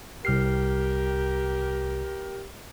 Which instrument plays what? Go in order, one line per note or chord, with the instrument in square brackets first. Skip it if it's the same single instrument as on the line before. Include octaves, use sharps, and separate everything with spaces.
[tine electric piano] C2 F6 C7 [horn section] G4 A#4